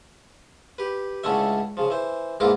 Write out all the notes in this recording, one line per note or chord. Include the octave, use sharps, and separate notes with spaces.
G4 B4
C#2 A2 D3 A3 C#4 E5
C#3 F3
E3 C5
E2 G#2 A#3 E4 F4 D6